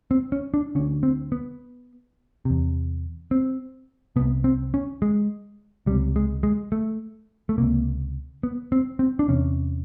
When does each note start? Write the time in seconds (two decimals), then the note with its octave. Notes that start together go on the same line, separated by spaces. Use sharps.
0.11 C4
0.32 C#4
0.54 D4
0.75 D3 C#4
0.79 D2
1.03 C4
1.32 B3
2.45 E2 C3
3.31 C4
4.16 C2 C3 B3
4.44 C4
4.74 C#4
5.02 G#3
5.86 C#2 C3 G3
6.16 G#3
6.43 G#3
6.72 A3
7.49 A3
7.58 C#2 C3 A#3
8.43 B3
8.72 C4
8.99 C4
9.19 D4
9.28 E2 C3 C#4